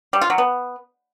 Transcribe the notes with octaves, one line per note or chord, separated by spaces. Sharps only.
G3
F4
F#3
B3